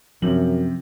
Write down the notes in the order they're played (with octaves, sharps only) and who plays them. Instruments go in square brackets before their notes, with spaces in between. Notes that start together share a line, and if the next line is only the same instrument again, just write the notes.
[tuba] F#2 [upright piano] C3 F#7 [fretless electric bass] F3